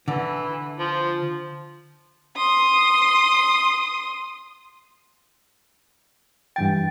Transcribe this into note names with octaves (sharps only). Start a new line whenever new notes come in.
D3 E3
F3
C6 D#6
G2 E3 G5 A6